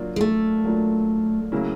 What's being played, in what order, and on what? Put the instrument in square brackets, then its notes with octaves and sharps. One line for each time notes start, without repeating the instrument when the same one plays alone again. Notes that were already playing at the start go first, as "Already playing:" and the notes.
Already playing: [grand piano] F#3 A#3 D4 F4
[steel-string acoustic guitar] G#3
A3
[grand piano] F#3 A#3 D4 F4
C#3 F#3 A#3 C#4 E4